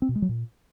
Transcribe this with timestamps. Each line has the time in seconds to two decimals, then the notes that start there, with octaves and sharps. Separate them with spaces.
0.02 C4
0.09 B2
0.15 G#3
0.22 F#3
0.29 A#2